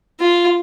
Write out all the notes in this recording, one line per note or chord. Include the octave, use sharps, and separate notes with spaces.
F4